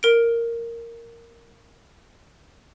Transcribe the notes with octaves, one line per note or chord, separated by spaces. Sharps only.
A#4 D7